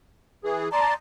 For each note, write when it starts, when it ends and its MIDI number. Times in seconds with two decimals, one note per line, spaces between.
0.44 0.68 52
0.44 0.68 68
0.72 0.94 74
0.72 0.94 81
0.72 0.92 82
0.72 0.94 84